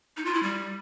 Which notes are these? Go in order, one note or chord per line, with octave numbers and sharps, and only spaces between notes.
D#4
F4
E4
G3